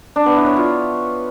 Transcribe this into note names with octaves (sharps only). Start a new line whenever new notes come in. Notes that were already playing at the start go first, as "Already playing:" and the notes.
D4
B3
E4
C#5
F4